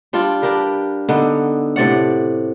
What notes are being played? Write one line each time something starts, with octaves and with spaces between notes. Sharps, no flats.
G3 D4 F4
D4 G4 A#4 B4
D3 B3 D#4
A2 C3 D5 F#5